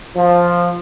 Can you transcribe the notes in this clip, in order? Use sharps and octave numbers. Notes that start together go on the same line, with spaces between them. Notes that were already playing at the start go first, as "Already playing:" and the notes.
F3